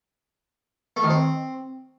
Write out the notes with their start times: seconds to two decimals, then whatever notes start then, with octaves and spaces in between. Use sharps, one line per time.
0.96 A3
1.03 D#3
1.10 C4